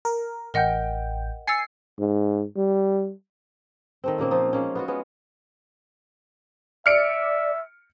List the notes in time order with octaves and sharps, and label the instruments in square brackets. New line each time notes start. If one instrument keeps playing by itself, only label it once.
[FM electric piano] A#4
[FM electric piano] A1 G5 [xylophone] A#4 D#5 F#5
[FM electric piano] G#5 C7 [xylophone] E6 A6 C#7
[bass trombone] G#2
G3
[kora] D#3 A3 C4
A#2 C#3 A#3 C4
F3 D#4 F4
G#3 A#3 C#4
B3 F4 F#4
G#3 B3 C#4
[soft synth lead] D5 [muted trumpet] E5 [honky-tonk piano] F6 C#7 D7